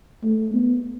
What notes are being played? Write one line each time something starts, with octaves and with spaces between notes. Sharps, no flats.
A3
B3